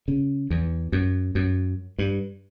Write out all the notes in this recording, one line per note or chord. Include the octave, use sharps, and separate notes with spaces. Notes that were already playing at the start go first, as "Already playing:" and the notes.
C#3
E2
F#2
F#2
G2